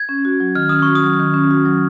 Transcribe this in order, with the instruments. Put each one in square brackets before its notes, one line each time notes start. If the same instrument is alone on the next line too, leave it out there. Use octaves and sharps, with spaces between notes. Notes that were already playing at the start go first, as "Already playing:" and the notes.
Already playing: [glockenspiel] G#6
[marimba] C#4
F#4
F#3
[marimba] D#3 [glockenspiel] F6
[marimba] C#4 [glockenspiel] D#6
[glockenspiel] C#6
[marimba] F#4
[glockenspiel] D#6
[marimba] F#3
D#3
C#4
F#4
F#3